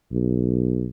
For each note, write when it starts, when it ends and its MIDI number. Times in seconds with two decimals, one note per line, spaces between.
0.12 0.86 35